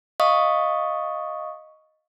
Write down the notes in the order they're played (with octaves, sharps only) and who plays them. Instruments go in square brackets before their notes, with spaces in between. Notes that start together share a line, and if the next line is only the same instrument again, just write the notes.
[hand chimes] D#5 F5 C#6 D#6